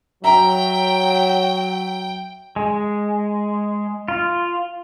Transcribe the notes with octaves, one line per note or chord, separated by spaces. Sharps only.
F#3 E5 G5 A#5
G#3
F4